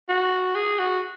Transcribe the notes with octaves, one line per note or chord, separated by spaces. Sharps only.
F#4
G#4
F#4